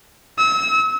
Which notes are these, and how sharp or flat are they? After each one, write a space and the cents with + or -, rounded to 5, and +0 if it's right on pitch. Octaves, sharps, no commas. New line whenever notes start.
E6 -40